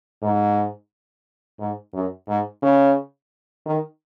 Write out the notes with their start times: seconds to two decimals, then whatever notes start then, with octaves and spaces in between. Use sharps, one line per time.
0.22 G#2
1.59 G#2
1.93 F#2
2.28 G#2
2.63 C#3
3.66 D#3